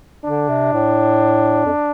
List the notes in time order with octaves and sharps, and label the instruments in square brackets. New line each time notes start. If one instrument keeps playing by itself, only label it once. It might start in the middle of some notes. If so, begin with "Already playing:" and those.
[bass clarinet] D3 [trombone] D4
[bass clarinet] C3
A2
F2